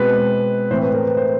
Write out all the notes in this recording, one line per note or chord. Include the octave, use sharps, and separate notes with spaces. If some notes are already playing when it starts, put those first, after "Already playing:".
Already playing: B2 G#3 C4 B4
A2 E3 A3 C4 C5
B4
A#4
B4
C5